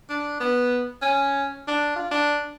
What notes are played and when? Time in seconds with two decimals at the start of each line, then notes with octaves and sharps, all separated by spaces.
0.09 D4
0.40 B3
1.02 C#4
1.68 D4
1.96 F4
2.11 D4